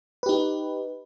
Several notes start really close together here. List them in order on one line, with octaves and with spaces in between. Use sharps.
B4 G4 D#4